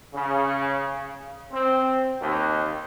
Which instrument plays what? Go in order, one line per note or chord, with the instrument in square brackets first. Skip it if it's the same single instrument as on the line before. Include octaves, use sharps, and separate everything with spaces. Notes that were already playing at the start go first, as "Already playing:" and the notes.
[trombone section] C#3
C4
D#2